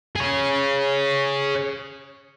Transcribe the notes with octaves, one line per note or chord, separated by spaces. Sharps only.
G#4 C#5